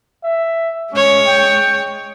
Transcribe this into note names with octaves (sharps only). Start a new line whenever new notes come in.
E5
G#3 C#4 C#5
G5